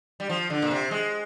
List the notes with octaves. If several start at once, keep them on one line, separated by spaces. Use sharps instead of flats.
G3
F3
D3
A#2
C3
G#3